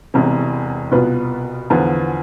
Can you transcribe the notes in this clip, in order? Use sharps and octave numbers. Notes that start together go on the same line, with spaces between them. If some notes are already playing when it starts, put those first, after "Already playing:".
E1 E2 C3
C2 B2 B3 F4 B4
E2 D3 F3 B3 F4